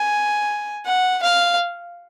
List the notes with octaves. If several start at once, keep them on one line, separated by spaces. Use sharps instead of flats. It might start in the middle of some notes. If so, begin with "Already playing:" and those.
Already playing: G#5
F#5
F5